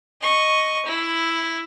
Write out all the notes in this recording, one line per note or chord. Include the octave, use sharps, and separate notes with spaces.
D#5 C#6
E4